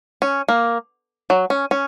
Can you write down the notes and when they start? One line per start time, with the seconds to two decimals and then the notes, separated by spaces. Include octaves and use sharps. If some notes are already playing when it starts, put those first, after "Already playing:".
0.22 C#4
0.48 A#3
1.30 F#3
1.50 C#4
1.71 C#4